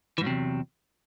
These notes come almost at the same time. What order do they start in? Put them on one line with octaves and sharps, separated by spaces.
E3 G#2 F#3 C3 E2